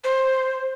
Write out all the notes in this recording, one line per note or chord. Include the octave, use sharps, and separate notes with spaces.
C5